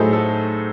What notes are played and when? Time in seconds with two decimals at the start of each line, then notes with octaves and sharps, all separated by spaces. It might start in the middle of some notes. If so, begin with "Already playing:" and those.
Already playing: A2 F#3 A3 D#4 G#4 A4 C5
0.13 A4